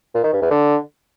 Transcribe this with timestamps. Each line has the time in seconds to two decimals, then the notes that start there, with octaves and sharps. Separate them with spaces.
0.15 A#2
0.24 D#3
0.33 G2
0.42 E2
0.51 D3